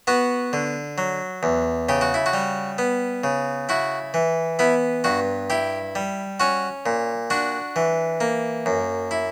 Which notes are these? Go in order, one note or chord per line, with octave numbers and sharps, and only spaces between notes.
B3 F#4
D3
F#3
E2
C#3 G4
F#4
E4
F#4
G3
B3
C#3
E4 F#4
E3
B3 E4
G2 F#4
E4 G4
G3
C#4 F#4
A#2
D4 F#4
E3
A#3
F#2
E4